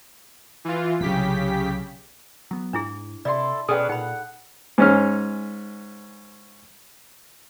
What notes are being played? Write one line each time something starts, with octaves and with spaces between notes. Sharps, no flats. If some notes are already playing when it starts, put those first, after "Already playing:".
E3 F4
C2 C#3 F#3 G4 B6
F#3 B3
G#2 D4 E4 G#4
C3 E4 A4 D5 C6
B2 C#4 D4 G#4 A4 B4 D5 G5
A#2 D#4 F#5 B5
G#2 C#4 F6